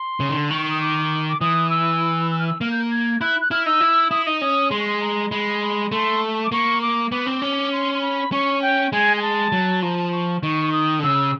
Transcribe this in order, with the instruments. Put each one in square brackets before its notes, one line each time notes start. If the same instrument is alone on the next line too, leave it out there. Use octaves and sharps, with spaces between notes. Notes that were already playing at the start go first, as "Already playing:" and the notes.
Already playing: [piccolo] C6
[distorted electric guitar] C#3
D#3
D3
[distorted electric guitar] D#3 [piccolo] C#6
[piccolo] D#6
D6
D6
[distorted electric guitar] E3 [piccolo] D#6
[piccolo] E6
E6
F6
E6
[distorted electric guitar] A#3 [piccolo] F6
[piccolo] G6
G#6
[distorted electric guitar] E4 [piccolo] F#6
[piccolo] F#6
[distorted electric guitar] E4 [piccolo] F6
[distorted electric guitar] D#4 [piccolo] E6
[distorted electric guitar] E4
[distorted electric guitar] E4 [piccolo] D#6
[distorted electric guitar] D#4 [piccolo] D#6
[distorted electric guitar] C#4 [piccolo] D#6
[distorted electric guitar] G#3 [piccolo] C6
[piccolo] C#6
C6
A#5
[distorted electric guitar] G#3 [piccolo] B5
[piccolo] B5
[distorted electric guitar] A3 [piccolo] C6
[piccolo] D6
[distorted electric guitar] A#3 [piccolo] C#6
[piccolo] D6
[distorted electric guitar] B3 [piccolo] D6
[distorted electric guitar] C4
C#4
[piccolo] C6
C6
B5
[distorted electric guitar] C#4 [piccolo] C#6
[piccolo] G5
[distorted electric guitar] G#3 [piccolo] G#5
[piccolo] G#5
A5
[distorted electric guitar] F#3
[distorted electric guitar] F3 [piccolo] A#5
[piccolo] A5
C#6
[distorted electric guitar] D#3 [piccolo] C#6
[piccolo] D#6
[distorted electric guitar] D3
[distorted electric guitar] C#3 [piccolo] E6